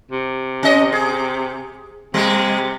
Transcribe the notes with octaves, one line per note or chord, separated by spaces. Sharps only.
C3
C#4 D#5
G#4
C3 G3 G#3